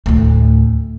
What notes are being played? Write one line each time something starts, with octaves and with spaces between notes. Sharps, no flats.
D2 A2